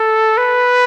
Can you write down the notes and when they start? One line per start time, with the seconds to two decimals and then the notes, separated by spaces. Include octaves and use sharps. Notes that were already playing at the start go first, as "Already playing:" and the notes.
Already playing: A4
0.37 B4